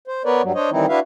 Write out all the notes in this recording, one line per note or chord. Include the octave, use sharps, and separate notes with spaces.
C5
B3 A#4 B4 C#5 D5
G2 F#3 G3
D4 C5 C#5 D#5
D#3 E3 G3 C4 D#4 E4
D4 E4 F#4 B4 E5 F5